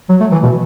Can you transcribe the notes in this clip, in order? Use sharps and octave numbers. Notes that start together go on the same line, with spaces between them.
F#3
A3
E3
B2